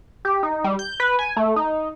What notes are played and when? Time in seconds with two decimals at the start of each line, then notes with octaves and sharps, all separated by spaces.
0.25 G4
0.43 D#4
0.64 G3
0.79 G6
1.00 B4
1.19 G#5
1.37 A3
1.56 D#4